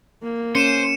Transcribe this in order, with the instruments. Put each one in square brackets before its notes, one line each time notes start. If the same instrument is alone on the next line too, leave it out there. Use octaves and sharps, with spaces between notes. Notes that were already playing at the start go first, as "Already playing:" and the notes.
[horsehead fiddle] A#3
[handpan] C#4 [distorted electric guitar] C5 [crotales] C#7 D#7 E7